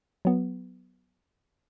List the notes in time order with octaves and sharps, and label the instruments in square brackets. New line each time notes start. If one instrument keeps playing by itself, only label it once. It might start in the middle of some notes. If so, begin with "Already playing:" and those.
[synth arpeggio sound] F#3 B3